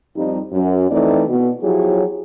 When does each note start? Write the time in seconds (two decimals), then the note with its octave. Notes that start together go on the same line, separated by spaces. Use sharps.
0.17 F2 G3 D#4
0.52 F#2
0.91 F2 E3 A3 C4 D#4 D5
1.29 B2
1.63 F3 F#3 E4 G4 G#4 C#5